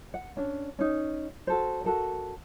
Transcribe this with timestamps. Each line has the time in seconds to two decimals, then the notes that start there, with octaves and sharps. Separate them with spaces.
0.14 F#5
0.37 C#4 D4
0.79 C#4 D#4
1.47 F#4 A4 C5
1.84 F#4 A4 A#4